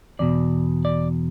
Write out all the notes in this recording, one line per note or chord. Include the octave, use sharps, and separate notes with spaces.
E2 B2 D5
D5